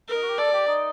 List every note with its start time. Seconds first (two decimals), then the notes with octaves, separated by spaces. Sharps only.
0.08 A#4
0.14 D#4
0.22 F#4
0.29 G4
0.38 A4 D5
0.53 G4
0.67 D#4